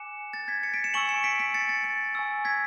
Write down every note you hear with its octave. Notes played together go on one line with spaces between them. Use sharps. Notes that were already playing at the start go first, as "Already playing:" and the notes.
Already playing: G#5 D6 F#6 C#7 E7
A6
G#6 B6
A6 C#7
B6 D7
C#7 E7
G#5 C#6 E6 D7 F#7
C#7 E7
B6 D7
B6 D7
A6 C#7
A6
A6
G#5 C#6 E6
G#6 B6